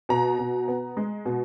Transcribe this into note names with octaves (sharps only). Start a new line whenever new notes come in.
B2 A#5
B2
B3
G#3
B2